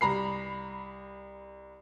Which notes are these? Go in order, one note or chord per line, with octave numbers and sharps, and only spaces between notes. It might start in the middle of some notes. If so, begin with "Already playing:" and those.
C2 A#5 B5 C7